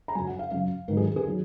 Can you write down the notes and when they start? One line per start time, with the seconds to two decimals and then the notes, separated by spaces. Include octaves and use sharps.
0.08 A#5
0.15 F#2 C#3 F#3 G#5
0.27 F#5
0.39 F5
0.51 F#2 C#3 F#3 F5
0.88 G#2 D#3 F#3 A#4
0.97 G#4
1.16 G#4
1.26 D#3 F#3